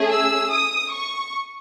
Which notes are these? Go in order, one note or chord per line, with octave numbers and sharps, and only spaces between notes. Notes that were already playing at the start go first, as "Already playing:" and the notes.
Already playing: A3 C#4 G#4
E6
D#6
C#6